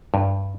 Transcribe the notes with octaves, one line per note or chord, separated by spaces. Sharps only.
G2